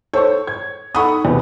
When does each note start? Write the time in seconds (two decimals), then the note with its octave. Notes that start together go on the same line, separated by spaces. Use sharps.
0.13 A4 C5 C#5 C#6
0.47 G#6
0.95 D#4 A4 F#5 B5 C#6 D#6
1.25 E2 C3 B4